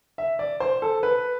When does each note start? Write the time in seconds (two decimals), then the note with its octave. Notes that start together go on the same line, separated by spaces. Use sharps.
0.18 E5
0.39 D5
0.60 C5
0.82 A4
1.03 B4